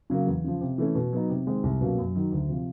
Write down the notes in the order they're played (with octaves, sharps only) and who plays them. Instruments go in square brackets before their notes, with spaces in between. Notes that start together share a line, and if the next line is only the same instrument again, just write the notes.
[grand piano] C#3 F#3 A#3
E2
C#3 F3
C3
E3 A3 C#4
B2
F#3 B3 D#4
C3
D#3 G#3 C4
C2
B2 F#3 A#3 C#4
F#2
D#3 F#3
D2
C3 F3